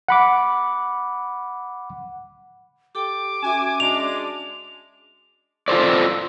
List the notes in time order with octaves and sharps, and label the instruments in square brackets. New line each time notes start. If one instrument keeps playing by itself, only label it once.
[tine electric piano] F#5 B5 D6
[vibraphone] G4 A4 G5 [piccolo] D6
[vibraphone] C#4 F#4 E5 [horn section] G#5
[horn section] G#3 D4 [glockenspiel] F7
[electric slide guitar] F4 A4 C5 D5